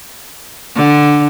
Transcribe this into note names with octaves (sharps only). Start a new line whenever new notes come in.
D3